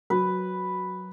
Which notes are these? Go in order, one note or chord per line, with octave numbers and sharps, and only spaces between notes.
F#3 B4